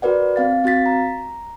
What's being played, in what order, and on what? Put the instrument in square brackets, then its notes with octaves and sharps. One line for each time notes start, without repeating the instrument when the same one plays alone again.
[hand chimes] F#4 A#4 B4 D5 F#5
C4 F5 A6
C4 F#4 F5 A6 B6
A#5